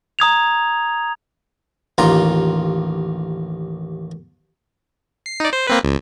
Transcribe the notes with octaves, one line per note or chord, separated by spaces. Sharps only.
A#5 D#6 G#6 F7
A1 D#2 F4 A#5 C6
C7
D#4 D5
C5
A#3 C4 B4
C#2